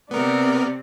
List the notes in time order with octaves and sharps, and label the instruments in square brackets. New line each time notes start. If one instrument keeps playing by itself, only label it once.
[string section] C3 [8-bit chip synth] B3 A#4 [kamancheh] D5